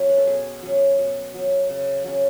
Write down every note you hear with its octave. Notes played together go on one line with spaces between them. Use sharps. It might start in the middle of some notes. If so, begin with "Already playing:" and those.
Already playing: F#3 C#4
B4
A4
B2 G#4
F#3 C#4
B2
F#3 C#4
C#3
F#3 C#4